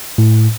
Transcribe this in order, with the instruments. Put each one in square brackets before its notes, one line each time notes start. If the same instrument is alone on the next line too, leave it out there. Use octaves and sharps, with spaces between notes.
[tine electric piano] A2